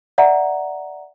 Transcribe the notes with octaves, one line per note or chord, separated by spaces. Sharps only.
D5 E5 F#5 A#5